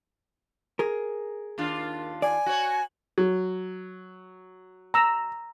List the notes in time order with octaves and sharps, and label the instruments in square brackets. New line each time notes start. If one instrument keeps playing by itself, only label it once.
[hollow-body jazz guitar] G#4 A#4
[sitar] D#2 D4 F4
[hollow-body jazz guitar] D5 [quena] G#5
[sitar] F#4 C#5
[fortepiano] F#3
[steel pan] A#5 E6